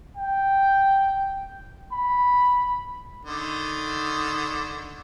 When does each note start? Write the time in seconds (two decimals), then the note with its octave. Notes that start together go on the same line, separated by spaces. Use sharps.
0.17 G5
1.92 B5
3.25 D3 D#3